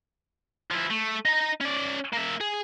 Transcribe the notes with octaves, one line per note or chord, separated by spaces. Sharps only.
F3 E4
A3
D#4 A#5
C#4 D5
A#3 E5
G#4